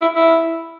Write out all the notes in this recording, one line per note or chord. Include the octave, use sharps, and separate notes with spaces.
E4
E4